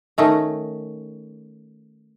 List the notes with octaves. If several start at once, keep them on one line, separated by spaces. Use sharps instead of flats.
D#3 A3 C#4 D#4